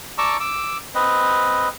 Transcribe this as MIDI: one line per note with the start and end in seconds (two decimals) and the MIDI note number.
0.18 0.37 74
0.18 0.37 81
0.18 0.37 82
0.18 0.37 85
0.18 0.37 86
0.18 0.37 88
0.40 0.78 86
0.40 0.78 88
0.95 1.69 60
0.95 1.69 71
0.95 1.69 75